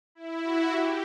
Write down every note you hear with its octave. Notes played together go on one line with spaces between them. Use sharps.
E4
F#4
G4